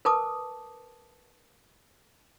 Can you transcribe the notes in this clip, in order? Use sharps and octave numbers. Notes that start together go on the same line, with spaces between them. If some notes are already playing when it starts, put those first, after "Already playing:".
A#4 B4 A5 D6 D#6